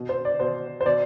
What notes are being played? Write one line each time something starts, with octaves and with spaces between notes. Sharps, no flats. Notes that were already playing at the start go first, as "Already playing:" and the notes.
Already playing: B2
C5
D5
B2 C5
C5
B2 D5